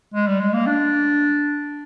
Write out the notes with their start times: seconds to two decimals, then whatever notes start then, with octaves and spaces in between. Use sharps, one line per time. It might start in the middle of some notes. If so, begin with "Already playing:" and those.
0.14 G#3
0.27 G3
0.40 G#3
0.54 A#3
0.67 D4